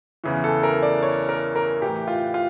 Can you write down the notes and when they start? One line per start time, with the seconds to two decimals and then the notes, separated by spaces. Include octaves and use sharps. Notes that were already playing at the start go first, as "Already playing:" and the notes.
0.24 E2 C#3 E3
0.44 A4
0.63 A#4
0.82 D5
1.03 C#5
1.29 A#4
1.56 A#4
1.82 A2 E3 G4
2.08 F4
2.34 F4